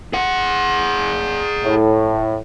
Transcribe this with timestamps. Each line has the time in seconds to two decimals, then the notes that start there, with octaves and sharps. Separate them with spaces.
0.14 G#4 F#5
1.63 A2